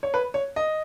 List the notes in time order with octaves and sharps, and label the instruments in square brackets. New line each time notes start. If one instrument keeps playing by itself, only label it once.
[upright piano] C#5
B4
C#5
D#5